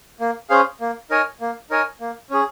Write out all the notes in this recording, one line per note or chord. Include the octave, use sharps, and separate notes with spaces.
A#3
C#4 G#4 C5 F5
A#3
D#4 A#4 C#5 G#5
A#3
D#4 A#4 C#5 G#5
A#3
C#4 G#4